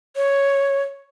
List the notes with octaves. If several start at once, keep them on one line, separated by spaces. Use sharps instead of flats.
C#5